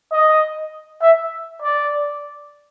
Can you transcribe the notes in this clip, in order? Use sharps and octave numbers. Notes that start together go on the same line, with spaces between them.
D#5
E5
D5